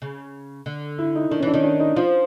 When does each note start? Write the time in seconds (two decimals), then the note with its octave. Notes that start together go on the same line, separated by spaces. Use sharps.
0.02 C#3
0.66 D3
0.98 E4
1.15 D#4
1.31 D#3 D4
1.39 C#4
1.43 E3 D4
1.54 D#3 C#4
1.64 D4
1.80 D#4
1.96 F3 F4